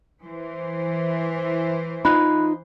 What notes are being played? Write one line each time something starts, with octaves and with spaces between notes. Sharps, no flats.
E3 C5
D#4 F4 D#5 B5 F#6